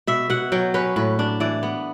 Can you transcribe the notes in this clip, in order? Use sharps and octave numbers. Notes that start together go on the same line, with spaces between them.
B2 E5
B2 F#5
F#3 G5
C#4 B4
A2 B4
D4
E3 D5
B3